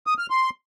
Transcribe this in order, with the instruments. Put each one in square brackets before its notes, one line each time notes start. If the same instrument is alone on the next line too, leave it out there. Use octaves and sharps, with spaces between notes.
[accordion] D#6
F6
C6